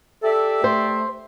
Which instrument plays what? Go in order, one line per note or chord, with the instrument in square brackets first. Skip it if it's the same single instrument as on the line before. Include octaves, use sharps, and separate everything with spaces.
[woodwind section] G4 D5 E5 [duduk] A4
[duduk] A3 [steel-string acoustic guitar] C5